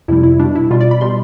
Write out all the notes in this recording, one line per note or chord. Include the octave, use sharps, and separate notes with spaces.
F2 C3 G3 E4
E4
B2 G3 D4
E4
B2 G3 F4
D5
B5
B2 G3 C6